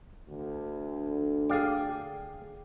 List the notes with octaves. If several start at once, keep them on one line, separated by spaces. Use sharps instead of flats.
D2 D3
G#4 D5 F5 G5